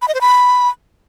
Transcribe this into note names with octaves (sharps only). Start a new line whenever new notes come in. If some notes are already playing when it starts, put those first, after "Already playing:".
B5
D#5
C5
B5